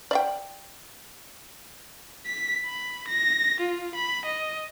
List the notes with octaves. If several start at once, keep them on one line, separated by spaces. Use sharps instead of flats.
D5 E5 G5
B6
B5
A#6
F4
B5
D#5